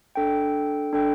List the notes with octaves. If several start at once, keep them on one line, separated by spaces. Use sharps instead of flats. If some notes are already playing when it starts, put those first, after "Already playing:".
D4 A4 G5
D4 A4 G5